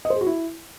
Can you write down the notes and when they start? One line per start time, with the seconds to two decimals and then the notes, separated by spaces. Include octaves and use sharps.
0.05 D#5
0.10 C5
0.16 G#4
0.21 F#4
0.26 E4